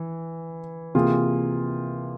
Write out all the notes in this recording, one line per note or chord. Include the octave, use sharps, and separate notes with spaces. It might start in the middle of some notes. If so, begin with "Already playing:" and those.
Already playing: E3
C3 E3 A#3 F4 G#4